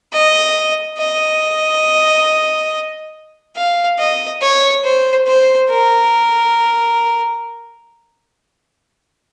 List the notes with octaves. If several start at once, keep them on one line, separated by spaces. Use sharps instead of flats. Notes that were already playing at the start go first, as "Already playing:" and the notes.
D#5
D#5
F5
D#5
C#5
C5
C5
A#4